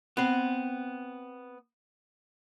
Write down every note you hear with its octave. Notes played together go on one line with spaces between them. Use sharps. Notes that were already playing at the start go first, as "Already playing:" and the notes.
B3 C4